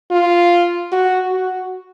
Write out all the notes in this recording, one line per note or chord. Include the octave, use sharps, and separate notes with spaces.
F4
F#4
F#4